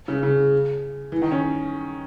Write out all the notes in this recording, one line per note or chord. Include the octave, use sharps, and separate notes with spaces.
C#3
C#3
E3
D#3
C#4